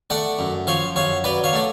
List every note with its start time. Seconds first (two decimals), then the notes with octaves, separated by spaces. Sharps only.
0.10 A3 D5 F#5
0.39 F#2
0.67 F3 C#5 F5
0.96 F#2 C#5 F5
1.24 F#3 B4 D5
1.44 C#5 F5
1.53 A3 D5